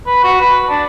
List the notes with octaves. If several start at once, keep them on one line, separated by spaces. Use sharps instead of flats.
B4
F#4
B4
D4